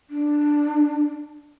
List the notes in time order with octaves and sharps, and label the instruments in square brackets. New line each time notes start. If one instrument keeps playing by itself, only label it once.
[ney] D4